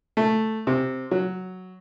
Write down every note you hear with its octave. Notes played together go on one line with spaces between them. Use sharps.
A3
C3
F#3